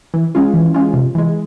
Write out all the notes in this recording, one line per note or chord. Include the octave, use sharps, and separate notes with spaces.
E3
G#3 C#4 F4
E3
G#3 C#4 F4
C3
E3 G#3